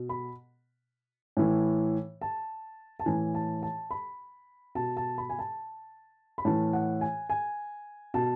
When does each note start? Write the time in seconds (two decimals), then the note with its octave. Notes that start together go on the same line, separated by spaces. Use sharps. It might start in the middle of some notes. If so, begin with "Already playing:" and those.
Already playing: B2
0.09 B5
1.37 A2 E3
2.22 A5
3.00 A5
3.06 A2 E3 G#5
3.35 A5
3.63 A5
3.91 B5
4.75 B2 A5
4.97 A5
5.18 B5
5.30 G#5
5.39 A5
6.38 B5
6.45 A2 E3 A5
6.73 F#5
7.01 G#5
7.30 G#5
8.14 B2 A5